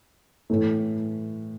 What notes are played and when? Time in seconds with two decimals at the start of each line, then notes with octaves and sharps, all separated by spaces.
0.50 A2 E3 A3